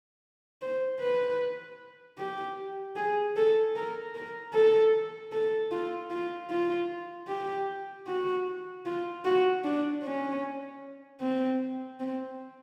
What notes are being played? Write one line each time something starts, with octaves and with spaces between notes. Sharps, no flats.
C5
B4
G4
G#4
A4
A#4
A#4
A4
A4
F4
F4
F4
G4
F#4
F4
F#4
D4
C#4
C4
C4